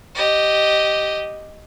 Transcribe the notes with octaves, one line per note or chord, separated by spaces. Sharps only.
G4 D#5